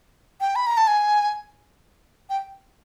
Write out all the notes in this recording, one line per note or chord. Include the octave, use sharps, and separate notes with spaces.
G5
B5
A#5
A5
G#5
G5